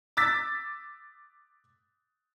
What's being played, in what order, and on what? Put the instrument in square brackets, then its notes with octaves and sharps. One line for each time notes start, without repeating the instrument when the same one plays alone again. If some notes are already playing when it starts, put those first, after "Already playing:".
[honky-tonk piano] D6 E6 A6 B6